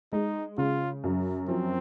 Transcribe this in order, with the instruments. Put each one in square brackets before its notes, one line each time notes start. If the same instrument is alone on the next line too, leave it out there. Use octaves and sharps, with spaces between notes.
[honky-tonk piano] G#3 [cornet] D#4
[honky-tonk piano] C#3 [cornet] F4
[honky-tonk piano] F#2
[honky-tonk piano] F3 [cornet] C4